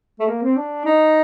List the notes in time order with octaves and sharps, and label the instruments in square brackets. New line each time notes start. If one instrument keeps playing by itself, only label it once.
[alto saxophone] A3
A#3
C4
D4
D#4